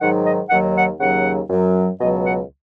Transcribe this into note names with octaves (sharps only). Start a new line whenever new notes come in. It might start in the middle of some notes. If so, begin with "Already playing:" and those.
G#2 D#3 F#3 F#5
D#5
D#2 D#3 F#3 F#5
F#5
D#2 C#3 F#3 F#5
F#2 F#3
C#2 B2 F#3 D#5
F#5